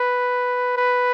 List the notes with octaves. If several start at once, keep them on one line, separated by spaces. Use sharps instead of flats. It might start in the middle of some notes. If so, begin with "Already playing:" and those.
Already playing: B4
B4